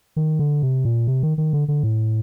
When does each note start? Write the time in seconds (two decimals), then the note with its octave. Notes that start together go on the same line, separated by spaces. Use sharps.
0.16 D#3
0.39 D3
0.62 C3
0.85 A#2
1.07 C3
1.23 D#3
1.38 D#3
1.53 D3
1.68 D3
1.83 A2